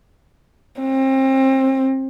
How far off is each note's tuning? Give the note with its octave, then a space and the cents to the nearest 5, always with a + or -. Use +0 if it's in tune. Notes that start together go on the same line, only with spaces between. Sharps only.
C4 +30